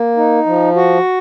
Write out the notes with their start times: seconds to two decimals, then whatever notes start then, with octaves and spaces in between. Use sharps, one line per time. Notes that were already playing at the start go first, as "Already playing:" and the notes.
Already playing: A#3
0.17 D#4
0.46 F3
0.76 F#4